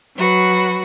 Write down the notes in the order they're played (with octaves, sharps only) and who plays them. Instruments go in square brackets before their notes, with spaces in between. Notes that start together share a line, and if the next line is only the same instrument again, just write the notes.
[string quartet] F#3 F#4 B4